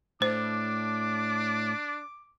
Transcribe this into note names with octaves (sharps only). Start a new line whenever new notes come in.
A2 D4 C5 D6